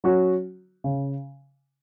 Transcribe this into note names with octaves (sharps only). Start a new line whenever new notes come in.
F#3 C#4 F#4
C#3